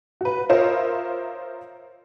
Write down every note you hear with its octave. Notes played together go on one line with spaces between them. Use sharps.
F#4 B4
F4 A#4 C5 C#5 D#5 E5